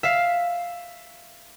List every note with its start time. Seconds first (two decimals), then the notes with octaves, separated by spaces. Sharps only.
0.03 E5 F5